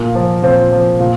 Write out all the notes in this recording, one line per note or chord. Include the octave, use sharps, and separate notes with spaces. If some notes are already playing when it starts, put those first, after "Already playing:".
Already playing: A#2 A#3
F3
A#2 C4
F3
A#2